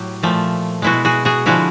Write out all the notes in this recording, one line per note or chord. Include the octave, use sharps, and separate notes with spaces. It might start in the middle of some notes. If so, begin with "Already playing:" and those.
Already playing: A2 F#3 G4
A#2 F3 A3
B2 G#3 E4 F#4
F#4 G#4
F#4 G#4
D3 F3 G#3 E4 F#4